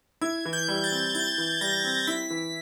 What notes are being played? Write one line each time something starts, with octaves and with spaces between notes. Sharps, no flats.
E4 G#6
E3
G6
G3
A6
C4
E4 A6
E3
G3 A#6
C4
E4 B6
E3